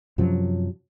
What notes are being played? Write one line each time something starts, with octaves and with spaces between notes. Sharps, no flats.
F#2 C3 F3 F#3